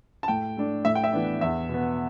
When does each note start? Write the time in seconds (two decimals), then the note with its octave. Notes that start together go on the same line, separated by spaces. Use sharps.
0.23 A5
0.28 A2 G5
0.57 A3 D4
0.85 A2 E5
0.95 G5
1.04 E5
1.12 E3 B3 D4
1.41 E2 E5
1.69 B2
1.74 B3